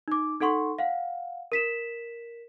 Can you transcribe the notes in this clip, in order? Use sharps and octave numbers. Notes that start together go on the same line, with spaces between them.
D#4 D6
D#4 A4 F#5 C6 C#6
F5 F#5
A#4 B6 E7